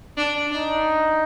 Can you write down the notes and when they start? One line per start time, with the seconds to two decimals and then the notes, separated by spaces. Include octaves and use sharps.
0.17 D4
0.52 D4 D#4